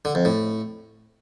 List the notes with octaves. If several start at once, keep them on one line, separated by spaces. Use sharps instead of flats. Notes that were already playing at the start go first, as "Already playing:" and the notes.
D3
F2
A2